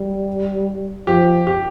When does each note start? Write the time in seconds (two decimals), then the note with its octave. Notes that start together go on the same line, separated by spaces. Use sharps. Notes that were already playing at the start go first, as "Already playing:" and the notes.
Already playing: G3
1.07 F3 G4
1.47 G4